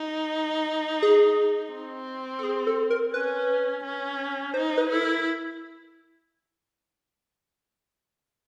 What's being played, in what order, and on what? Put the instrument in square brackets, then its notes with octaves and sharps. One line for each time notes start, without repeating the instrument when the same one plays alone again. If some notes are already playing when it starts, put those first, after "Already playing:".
Already playing: [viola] D#4
[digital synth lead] G#4
[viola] C4
[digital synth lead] A4
G#4
A4
A#4
[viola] C#4 [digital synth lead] B4
[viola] C#4
[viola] D#4 [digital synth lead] C5
[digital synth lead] B4
[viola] E4 [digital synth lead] A4
[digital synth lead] A#4